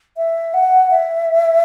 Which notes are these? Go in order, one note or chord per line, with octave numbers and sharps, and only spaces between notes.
E5
F#5
E5